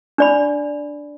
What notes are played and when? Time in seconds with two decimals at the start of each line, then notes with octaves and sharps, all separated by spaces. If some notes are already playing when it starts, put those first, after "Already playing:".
0.18 D4 D5 B5